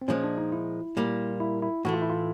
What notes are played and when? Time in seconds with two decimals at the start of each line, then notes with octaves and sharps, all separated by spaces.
0.02 C4
0.08 A#2 F3 G#3 C#4
0.24 D4
0.38 D#4
0.52 E4
0.97 A#2 G3 A#3
1.40 E4
1.62 E4
1.85 A2 E3 A3 F#4
1.94 F4
2.02 E4
2.10 F4